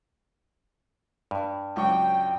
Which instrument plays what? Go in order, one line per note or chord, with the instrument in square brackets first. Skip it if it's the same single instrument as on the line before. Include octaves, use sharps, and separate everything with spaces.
[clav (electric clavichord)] G2
[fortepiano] C#2 F#3 C#6 [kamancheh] G5